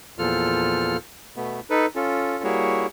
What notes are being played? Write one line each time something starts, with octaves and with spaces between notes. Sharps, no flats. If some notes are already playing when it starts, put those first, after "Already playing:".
E2 A#2 F3 F4 A4 F6
B2 A3 B3
D#4 A4 B4
C#4 F4 A4
G3 A#3 E4 F#4 G#4 C#5